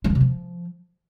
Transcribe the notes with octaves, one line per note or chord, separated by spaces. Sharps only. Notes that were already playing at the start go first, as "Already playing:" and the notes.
G#3
E3
C3
F3